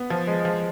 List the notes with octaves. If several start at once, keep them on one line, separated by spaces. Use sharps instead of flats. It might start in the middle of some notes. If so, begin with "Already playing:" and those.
Already playing: B3
F3
G#3
F3